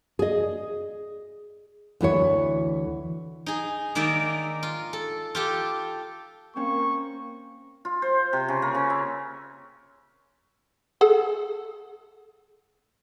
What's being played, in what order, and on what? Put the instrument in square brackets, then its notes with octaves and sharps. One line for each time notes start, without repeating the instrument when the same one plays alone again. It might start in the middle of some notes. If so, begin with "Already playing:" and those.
[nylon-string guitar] G#4 D#5
D2 E3 E4 C#5
[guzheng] D#4 G#4
D#3 A#3 D#4 D5 E5
F4
A4
F4 G4 A4
[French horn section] A#3 [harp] C4 C#4 [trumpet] C#6
[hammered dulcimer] F4
C5
C3
C#3
A#3
C#3
E5
[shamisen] G#4 A4 F#5